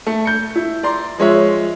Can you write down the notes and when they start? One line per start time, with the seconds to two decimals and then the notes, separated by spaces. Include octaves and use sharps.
0.07 A3
0.25 G6 C#7
0.56 E4
0.83 D5 A#5 C6
1.18 F3 G#3 C#5 E5